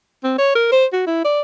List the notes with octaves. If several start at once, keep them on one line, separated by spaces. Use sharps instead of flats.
C4
C#5
A#4
C5
F#4
E4
D5